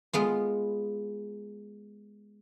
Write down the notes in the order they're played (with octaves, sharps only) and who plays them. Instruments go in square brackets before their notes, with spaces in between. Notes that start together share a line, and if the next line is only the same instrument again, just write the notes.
[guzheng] G#3 B3 F4